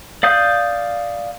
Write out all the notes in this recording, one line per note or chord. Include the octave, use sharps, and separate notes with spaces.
D5 F5 D#6 G6